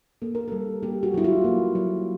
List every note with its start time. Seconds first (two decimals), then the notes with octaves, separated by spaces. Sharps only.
0.22 A#3 A4
0.35 A#4
0.48 G3 A4
0.83 A#3 G4
1.03 F#4
1.14 F#3 E4
1.24 F4
1.44 A#3
1.75 F#3